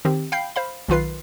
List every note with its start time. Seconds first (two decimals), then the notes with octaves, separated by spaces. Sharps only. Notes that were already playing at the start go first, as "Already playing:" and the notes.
0.05 D#3 C4 G4
0.32 F5 G5 B5 G6 C7
0.56 C5 F5 B5
0.89 B1 D#3 F4 B4 C7